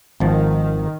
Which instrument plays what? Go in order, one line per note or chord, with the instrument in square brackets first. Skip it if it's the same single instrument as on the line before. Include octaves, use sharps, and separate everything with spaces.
[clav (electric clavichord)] G#1 F3 A5 [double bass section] D#3